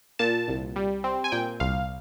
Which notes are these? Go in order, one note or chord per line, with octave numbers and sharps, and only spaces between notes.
A#2 A5
C2
G3
C4
G#5
A#2 G5
C2 F5